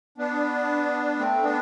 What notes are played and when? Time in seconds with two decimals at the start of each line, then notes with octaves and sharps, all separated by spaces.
0.18 B3 D4
1.18 A3 C4
1.43 B3 D4